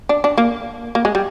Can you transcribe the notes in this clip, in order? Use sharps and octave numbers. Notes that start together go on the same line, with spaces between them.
D4
D4
A#3
A#3
G#3
G3